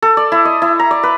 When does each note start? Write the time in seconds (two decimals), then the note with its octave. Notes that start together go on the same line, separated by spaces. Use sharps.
0.02 A4
0.17 D5
0.32 E4
0.45 D#5
0.62 E4
0.79 A#5
0.91 D5
1.03 B4